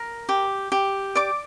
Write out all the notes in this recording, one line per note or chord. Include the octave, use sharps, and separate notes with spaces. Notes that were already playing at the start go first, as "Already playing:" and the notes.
Already playing: A#4
G4
G4
D5 D6